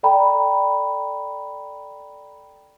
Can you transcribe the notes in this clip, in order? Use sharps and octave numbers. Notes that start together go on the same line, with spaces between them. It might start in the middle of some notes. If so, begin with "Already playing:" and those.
A4 D5 G5 A#5 B5